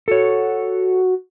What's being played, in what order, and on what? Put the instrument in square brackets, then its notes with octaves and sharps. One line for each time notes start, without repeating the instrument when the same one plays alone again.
[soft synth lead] F#4 [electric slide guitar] A4 C#5